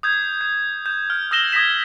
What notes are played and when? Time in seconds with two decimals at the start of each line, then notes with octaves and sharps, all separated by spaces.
0.03 D#6 G6 G#6
0.41 G6
0.86 G6
1.10 F6
1.31 D#6 E6 A#6 E7 G7
1.52 D#6 G#6 A#6 B6 E7